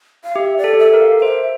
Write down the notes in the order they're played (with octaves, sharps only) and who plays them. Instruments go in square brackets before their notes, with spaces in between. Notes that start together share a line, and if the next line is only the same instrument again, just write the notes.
[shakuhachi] F5
[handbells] G4 [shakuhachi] E5
[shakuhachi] D5
[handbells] A4
G4
[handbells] A4 [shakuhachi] E5
[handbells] A#4
[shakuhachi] F5
F5
[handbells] C5 [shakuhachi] E5